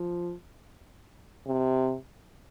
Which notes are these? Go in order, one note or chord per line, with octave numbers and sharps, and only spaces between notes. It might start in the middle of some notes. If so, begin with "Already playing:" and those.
Already playing: F3
C3